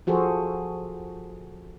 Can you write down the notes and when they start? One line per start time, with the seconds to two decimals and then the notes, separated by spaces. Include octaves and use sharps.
0.07 F3 F#4 G#4 A4 C5